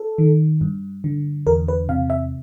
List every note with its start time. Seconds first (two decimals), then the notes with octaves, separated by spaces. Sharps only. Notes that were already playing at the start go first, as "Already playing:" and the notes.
Already playing: A4
0.18 D#3
0.61 G2
1.04 D3
1.47 E2 A#4
1.68 B4
1.89 C3 F5
2.10 E5